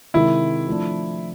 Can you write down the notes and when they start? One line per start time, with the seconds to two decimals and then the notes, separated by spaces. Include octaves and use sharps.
0.14 C3 D#3 G#3 E4
0.67 F3 A3 D4